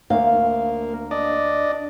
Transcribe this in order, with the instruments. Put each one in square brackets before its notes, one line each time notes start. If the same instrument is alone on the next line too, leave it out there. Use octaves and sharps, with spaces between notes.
[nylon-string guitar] D2 F5 [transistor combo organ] A#3
[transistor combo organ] D4 D5 D#5